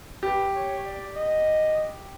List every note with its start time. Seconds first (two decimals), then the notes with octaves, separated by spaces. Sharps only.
0.23 G4 B4
0.55 C#5
0.85 D5
1.16 D#5